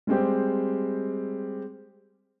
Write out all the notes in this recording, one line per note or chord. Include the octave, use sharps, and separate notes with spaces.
G3 G#3 C4 G4